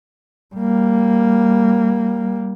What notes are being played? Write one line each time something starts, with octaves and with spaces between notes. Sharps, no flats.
G3 A#3